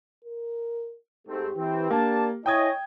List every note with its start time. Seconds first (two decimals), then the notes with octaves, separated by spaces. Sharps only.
0.25 A#4
1.28 G#2 A3 C4 G4
1.57 E3 C4
1.90 A#3 D4 A5
2.46 E4 C#5 D#5 G5 G#5 D#6 G#6